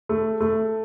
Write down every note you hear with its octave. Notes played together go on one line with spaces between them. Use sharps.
A3
A3